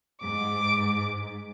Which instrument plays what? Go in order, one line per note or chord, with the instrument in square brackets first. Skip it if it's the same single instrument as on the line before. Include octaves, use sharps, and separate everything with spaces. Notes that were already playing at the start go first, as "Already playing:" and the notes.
[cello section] G#2 [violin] D6